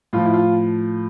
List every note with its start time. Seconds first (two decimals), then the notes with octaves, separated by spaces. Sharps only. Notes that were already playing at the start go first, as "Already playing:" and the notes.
0.13 A2 F3 F4
0.25 E4
0.33 F4